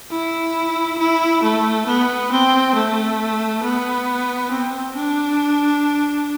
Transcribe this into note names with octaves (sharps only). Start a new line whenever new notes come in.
E4
E4
A3
B3
C4
A3
B3
C4
D4